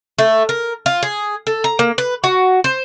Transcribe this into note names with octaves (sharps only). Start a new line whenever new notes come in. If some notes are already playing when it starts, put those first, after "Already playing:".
A3
A#4
F4
G#4
A4
A#5
A#3
B4
F#4
C5